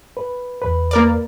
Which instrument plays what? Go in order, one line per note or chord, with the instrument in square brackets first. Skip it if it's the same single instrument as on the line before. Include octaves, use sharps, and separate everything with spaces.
[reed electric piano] B4
E2 B4
[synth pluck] A#3 A#4 D5